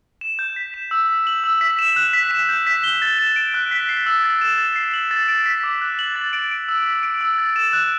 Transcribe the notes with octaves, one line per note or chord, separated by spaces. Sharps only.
E7
G6
B6
E7
E6
B6
F#7
E6
B6
E7
F#6
B6
E7
G6
B6
G7
A6
E7
D7
F#6
B6
C7
E6
A6
E7
A6
C7
F#7
A6
D7
B6
D6
F#6
F#7
A6
D7
D7
E6
B6
D7
E6
A6
E7
F#6